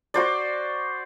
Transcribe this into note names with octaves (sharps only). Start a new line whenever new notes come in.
F#4 C5 D5